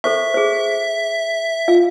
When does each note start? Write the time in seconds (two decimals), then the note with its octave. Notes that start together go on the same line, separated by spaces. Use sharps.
0.04 A4 C5 E5 C#6
0.34 G#4 C5
1.68 F4 F5